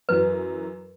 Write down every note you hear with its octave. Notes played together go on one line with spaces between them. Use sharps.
F#2 E3 F#3 B4